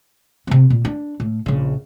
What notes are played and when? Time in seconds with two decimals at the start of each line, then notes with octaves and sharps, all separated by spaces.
0.47 C3 C4
0.70 A#2
0.85 D4
1.20 A2
1.46 A#1 C#3